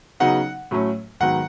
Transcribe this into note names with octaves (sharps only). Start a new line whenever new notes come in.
C#3 F#3 B3 D#4 F#5
A2 F#3 A3 C#4
G#2 D#3 F#3 B3 F#5